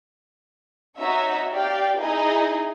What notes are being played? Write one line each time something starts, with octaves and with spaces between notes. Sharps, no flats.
D#4 F#4 C#5 E5
G4 D5 F5 G5
D#4 E4 G#4 D#5